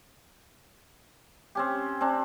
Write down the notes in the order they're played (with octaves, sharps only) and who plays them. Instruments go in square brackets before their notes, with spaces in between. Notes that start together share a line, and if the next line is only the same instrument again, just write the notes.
[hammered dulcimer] C4 C#4 G4
C4 D4